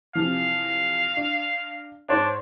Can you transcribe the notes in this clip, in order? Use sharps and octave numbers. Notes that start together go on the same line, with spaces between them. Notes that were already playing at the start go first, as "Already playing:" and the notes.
C3 E3 F3 F5
D4
G#2 D4 C5 C#5